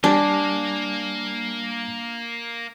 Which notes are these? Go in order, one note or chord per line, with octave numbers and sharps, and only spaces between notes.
G3 A#3 D4 A#4 G#5